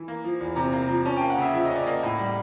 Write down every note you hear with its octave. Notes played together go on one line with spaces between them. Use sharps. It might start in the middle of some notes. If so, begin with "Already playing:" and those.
Already playing: E3
A#3
F3
E2
C3 A#5
A#3
F3
C#4 A5
G5
A#3
F#5
C#3 E5
F3 E5
C#4 D#5
D5
A#3 D#5
A2
G3